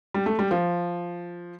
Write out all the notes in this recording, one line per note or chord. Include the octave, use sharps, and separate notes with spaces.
G3
A3
G3
F3